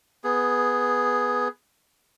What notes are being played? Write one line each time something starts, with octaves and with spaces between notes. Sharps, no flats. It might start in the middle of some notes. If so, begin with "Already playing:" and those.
B3 G#4